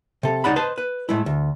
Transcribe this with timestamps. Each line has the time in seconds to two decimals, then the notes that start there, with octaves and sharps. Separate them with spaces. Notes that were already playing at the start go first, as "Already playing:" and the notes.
0.23 C3 A4
0.44 C#2 D#3 D#4 D5 F#5 B5
0.56 B4 C5 D#5 A5
0.78 B4
1.09 A2 G#3 E4
1.26 D2